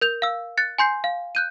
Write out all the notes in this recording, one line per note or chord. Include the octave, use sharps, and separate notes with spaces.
A#4 G6 F7
F5 E6
F#6 A6 C#7
G#5 C6 G6 C7
F5
F#6 G6 D#7